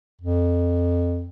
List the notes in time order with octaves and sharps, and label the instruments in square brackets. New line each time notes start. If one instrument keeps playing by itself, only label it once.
[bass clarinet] F2